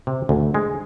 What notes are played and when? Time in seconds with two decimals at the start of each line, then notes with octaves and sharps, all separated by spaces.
0.07 C3
0.29 D2
0.54 G#3